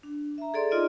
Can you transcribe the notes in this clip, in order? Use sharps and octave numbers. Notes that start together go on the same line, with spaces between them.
D4
E5 A#5
G#4 A4 D5 C6
D#4 F4 D5 D#5